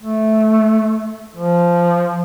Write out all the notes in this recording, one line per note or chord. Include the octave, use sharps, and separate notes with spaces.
A3
F3